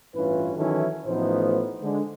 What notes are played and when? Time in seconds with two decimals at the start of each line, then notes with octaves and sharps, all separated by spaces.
0.15 A1 G2 E3 C#4 F4 B4
0.56 D#3 E3 F#3 C#4 E4 A4
1.06 A1 A2 F3 B3 D#4 C5
1.83 D3 G#3